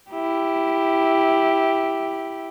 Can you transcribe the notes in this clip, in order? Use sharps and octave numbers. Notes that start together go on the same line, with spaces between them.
E4 G4